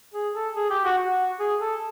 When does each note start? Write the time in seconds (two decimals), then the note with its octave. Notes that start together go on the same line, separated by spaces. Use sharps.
0.14 G#4
0.35 A4
0.57 G#4
0.70 G4
0.85 F#4
0.98 F#4
1.40 G#4
1.61 A4